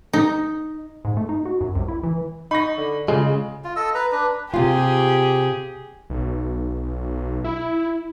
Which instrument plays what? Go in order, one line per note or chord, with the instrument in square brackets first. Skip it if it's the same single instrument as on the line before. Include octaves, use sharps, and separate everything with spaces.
[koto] D#4
[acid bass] G#2
A3
D#4
F#4
F#2
C2
E4
E3
[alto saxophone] D#4 [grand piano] B5 C#6 A#6
[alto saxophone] D3
[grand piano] C#3 [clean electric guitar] G#3 [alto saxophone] F4
[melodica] F4
A4 D#5 E6
B4 A#5
D4 B4
[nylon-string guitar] C3 F4 [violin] G4 G#4
[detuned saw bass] B1
E4